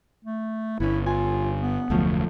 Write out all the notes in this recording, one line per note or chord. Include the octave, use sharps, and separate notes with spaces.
A3
G1 B3 C#4 E4
F4 G#5
B3
F1 D2 F3 F#3 A3